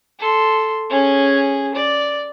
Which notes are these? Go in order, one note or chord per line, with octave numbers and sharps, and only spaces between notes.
A4 C6
C#4 G#4
D5